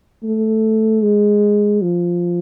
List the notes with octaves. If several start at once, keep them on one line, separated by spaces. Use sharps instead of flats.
A3
G#3
F3